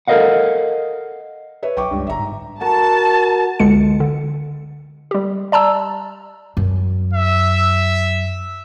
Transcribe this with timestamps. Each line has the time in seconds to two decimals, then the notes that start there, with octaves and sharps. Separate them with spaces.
0.08 A4 A#4 C5 D#5 F5 F#5
1.63 B4 C#5 E5
1.77 B1 G5 C#6 D6
1.91 C#2 G2
2.07 G1 E5 A#5
2.19 G#2
2.61 F#4 A#4 A5
3.59 G1 C#2 D3 G#3 C#7
4.00 D3
5.11 G3 G4
5.52 D5 A5 A#5 E6
6.57 F#2
7.13 E5